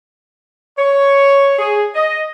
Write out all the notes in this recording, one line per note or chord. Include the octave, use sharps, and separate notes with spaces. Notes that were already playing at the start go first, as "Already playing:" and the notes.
C#5
G#4
D#5